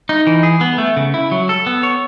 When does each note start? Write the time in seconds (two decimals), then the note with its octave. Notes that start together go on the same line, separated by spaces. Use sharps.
0.09 D#4
0.27 E3
0.43 G#4
0.61 B3
0.78 A3
0.96 C#3
1.14 E4
1.31 F#3
1.49 A4
1.66 B3
1.83 C#5